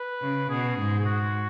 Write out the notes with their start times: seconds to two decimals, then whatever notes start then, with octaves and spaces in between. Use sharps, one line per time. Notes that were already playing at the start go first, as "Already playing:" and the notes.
Already playing: B4
0.22 C#3
0.50 B2 G#4
0.78 G#2
1.00 G#4
1.05 F#4